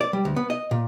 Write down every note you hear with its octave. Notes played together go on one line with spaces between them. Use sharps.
D5
G3
D2
B3
D#5
A#2